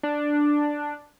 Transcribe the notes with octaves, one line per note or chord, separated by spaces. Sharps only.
D4